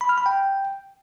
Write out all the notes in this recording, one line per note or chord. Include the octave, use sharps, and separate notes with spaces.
B5
F6
B5
G5